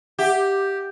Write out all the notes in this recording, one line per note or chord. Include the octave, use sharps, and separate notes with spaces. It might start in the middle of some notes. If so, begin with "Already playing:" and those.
G4 E5 F#5